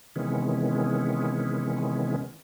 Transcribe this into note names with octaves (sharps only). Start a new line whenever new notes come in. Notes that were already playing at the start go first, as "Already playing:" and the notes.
C3 D#3 E3 G#3 B3 C#4